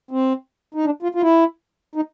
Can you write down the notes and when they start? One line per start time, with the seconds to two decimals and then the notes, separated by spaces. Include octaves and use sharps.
0.11 C4
0.74 D#4
0.85 D4
1.02 F4
1.15 F4
1.22 E4
1.95 D#4